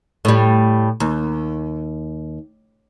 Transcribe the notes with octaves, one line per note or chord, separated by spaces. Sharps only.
A2 G3
D#2